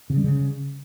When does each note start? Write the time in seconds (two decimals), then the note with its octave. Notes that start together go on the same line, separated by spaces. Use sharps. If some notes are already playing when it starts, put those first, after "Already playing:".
0.10 C#3
0.17 G3
0.24 C#3